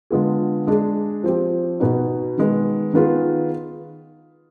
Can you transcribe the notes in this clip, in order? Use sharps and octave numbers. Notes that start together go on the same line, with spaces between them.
D3 G#3 B3 F4 G#4
G#3 D4 G#4
F3 C4 G4
B2 B3 D#4
D#3 G#3 B3
D#3 B3 F4 G#4